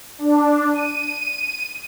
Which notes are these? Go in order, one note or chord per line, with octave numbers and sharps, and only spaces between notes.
D4
D#7